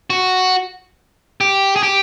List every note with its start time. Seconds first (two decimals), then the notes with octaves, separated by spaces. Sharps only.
0.10 F#4
1.41 G4
1.76 G#4
1.83 G4